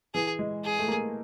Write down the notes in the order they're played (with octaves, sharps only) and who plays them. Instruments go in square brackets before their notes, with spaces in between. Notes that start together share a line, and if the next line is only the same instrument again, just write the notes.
[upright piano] E3 [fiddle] G#4
[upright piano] G#3
[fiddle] G#4
[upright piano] A3
A#3